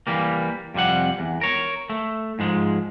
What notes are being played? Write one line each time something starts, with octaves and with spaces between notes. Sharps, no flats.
E3 G3 A#3
F2 C3 G3 F#5
E2
A#4 C#5
A3
G#2 F3 G#3